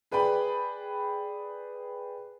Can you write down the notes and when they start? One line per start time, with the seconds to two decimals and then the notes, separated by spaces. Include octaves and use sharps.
0.11 G#4 B4 D5 G5 B5